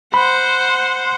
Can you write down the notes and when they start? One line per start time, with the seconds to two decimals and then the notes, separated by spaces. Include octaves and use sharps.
0.14 C5 F#5 B5